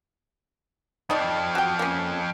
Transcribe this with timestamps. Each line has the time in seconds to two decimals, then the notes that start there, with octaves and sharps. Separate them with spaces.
1.10 F2 F3 D#4 D5
1.55 F#4 G5
1.79 A#3 C#4